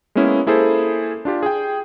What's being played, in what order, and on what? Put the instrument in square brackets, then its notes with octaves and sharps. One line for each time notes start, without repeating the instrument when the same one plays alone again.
[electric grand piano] G#3 A#3 B3 C#4 E4
A#3 E4 G#4 A4 C5
D4 F4 G4
G#4 G5